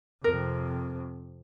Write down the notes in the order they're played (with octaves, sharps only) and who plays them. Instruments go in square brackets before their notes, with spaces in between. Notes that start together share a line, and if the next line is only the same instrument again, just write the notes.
[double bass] F2 C3 [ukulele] A#4